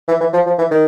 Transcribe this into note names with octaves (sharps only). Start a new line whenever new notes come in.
E3
E3
F3
F3
E3
D#3